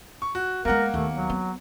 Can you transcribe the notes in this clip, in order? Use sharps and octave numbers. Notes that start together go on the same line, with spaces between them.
C#6
F#4
G#3 A#3 B3 A#4 F#5
D#2 A3 B3
F#3
B3